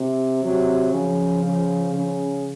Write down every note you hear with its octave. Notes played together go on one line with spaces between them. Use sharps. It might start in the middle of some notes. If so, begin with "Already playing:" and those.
Already playing: C3
C3 F#3
C#3 F3
C#3
C#3